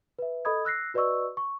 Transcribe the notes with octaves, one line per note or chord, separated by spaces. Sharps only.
B4 E5
A4 D#5 B5 D#6 G#6
E6 F#6 A#6 C7
F#4 B4 D5 D#5 C#6 E6
C#6